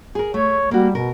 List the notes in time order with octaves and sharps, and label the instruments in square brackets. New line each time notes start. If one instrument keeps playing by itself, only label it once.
[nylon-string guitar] G#4 A#4
[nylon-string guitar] A3 [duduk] C#5
[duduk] G3 [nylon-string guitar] A#3 F#4
[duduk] B2 [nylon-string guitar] A#4